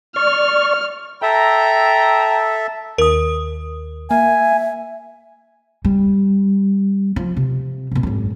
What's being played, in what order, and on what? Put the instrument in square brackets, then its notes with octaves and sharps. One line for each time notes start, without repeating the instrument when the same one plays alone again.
[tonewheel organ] D5 C#6 [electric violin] F6
[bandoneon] A4 E5 [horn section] G5 A#5
[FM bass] D#2 [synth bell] A#4 D#6
[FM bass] A#3 [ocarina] E5 [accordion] G#5
[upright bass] G3
F3
C3
B2 F3
G#1 F#2